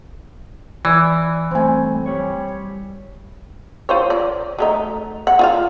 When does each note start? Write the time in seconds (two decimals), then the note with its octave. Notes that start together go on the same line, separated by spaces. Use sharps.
0.85 E3 D5
1.51 G2 A3 C4 G#5
2.06 G3 C#5
3.89 F4 C5 C#5
4.10 D5
4.58 F#3 A3 D#4
5.27 F#5
5.39 F4 D5 F5